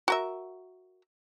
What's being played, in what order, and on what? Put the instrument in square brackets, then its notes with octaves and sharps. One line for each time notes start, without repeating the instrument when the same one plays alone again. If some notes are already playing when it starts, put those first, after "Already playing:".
[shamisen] F#4 A#4 E5